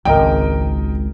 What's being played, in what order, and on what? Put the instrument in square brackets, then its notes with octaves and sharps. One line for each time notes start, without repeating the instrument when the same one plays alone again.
[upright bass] G#1 C#2 [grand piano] A#4 D#5 G5